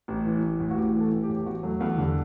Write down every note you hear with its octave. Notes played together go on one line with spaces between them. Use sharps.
A1
E3
A1
A2
F#4
A1 G4
E3
A4
A1
G4
A2
G4
E2 F#4
F#3 A3
E2 A3
D3 G3